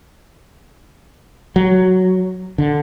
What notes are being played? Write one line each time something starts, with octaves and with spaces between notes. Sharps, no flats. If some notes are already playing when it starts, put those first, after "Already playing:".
F#3
D3